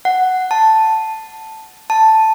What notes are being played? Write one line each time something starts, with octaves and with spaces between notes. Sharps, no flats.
F#5
A5
A5